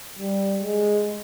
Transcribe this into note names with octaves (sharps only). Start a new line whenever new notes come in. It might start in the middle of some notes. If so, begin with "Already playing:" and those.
G3
G#3